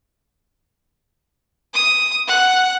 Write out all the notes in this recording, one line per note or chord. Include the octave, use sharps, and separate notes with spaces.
D#6
F#5